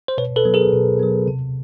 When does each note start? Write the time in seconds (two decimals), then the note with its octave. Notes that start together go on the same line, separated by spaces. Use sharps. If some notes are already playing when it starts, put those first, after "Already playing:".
0.08 C5
0.18 B2 B4 C#5
0.36 A4 B4
0.45 F#3 B3
0.54 G#4 A#4
0.73 B2
1.00 F#3 B3
1.28 C3